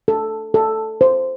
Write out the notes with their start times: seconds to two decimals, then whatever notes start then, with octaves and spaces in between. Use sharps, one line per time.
0.08 A4
0.54 A4
1.01 C5